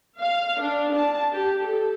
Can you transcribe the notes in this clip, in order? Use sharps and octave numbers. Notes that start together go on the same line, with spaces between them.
F5
D4
A5
G4
A4